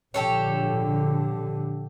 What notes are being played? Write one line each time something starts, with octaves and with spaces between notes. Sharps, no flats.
A#1 D3 G4 A4 C#5